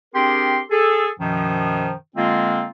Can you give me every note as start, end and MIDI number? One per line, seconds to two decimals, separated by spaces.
0.15 0.61 60
0.15 0.61 62
0.15 0.61 67
0.15 0.61 68
0.15 0.61 70
0.15 0.61 84
0.71 1.08 68
0.71 1.08 69
1.20 1.93 42
1.20 1.93 47
1.20 1.93 51
1.20 1.93 53
2.17 2.66 50
2.17 2.66 56
2.17 2.66 58
2.17 2.66 60
2.17 2.66 65